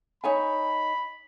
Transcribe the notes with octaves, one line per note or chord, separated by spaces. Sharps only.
D#4 C#5 G#5 B5